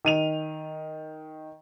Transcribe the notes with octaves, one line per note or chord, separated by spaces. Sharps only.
D#3 D#7 F7